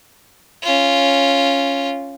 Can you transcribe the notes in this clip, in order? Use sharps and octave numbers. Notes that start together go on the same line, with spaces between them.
C#4 F4